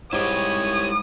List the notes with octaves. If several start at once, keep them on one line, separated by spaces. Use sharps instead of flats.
G#2 G3 E4 G4 C#5 D#6